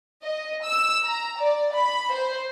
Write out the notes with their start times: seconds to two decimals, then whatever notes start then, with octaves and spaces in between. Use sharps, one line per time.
0.24 D#5
0.65 E6
1.05 A#5
1.39 D5
1.75 B5
2.15 C5